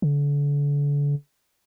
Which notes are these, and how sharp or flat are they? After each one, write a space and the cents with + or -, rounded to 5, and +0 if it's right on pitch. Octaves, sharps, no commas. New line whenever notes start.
D3 -35